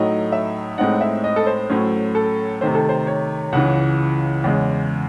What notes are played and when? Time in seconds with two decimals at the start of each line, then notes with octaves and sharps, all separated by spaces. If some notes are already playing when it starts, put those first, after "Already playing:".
Already playing: A2 F#3 A3 D#4 D#5
0.32 E5
0.78 A2 G#3 C4 D#4 F#5
1.01 E5
1.24 D#5
1.36 A4
1.46 C5
1.69 A2 F#3 A3 C#4 C5
2.15 A4
2.61 C3 D#3 A3 C5
2.75 A4
2.89 C5
3.07 C#5
3.52 C#2 C#3 E3 F#5
4.44 E2 C#3 G#3